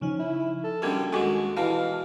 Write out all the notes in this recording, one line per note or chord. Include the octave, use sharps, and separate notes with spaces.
C#3 F3 C#4 D#4
E4
A4
D3 G3 A#3 C#4 D4 F#4 A#4 D#5
D#2 G#3 F#4 A4 G#5 C#6 D6
B2 E3 E4 F5 A5 F6